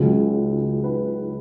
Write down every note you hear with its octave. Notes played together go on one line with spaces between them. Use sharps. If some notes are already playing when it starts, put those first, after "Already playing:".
Already playing: C#2 C#3 F#3
B4